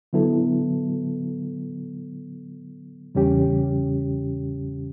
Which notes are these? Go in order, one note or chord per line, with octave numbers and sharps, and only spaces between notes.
D3 F#3 B3 E4 A4
E2 C#3 G3 C#4 G4